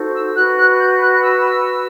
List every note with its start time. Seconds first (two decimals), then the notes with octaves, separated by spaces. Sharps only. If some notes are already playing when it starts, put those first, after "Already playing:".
Already playing: D#4 F#4 A4 C5
0.13 E6
0.34 F#4 B4 F#6
0.57 F#6
0.78 G6
1.00 F#6
1.11 F#6
1.21 E6